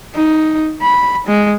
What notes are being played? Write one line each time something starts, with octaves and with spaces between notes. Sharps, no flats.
D#4
B5
G#3